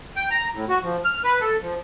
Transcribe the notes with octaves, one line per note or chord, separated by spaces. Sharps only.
G5
A#5
A2
F#4
F3
F6
B4
A4
F3